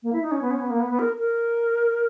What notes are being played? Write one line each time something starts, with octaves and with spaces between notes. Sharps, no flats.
A#3
E4
D#4
C#4
B3
C#4
B3
A#3
B3
B3
A#4
A#4